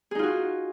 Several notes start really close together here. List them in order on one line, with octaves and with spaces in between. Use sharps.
G#4 D#4 F4 F#4